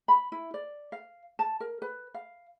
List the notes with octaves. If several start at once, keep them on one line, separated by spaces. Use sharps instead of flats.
B5
E4
D5
F5
A5
A#4
B4
F5